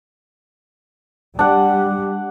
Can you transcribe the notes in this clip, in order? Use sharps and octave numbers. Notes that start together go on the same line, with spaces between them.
G3 D4 F#5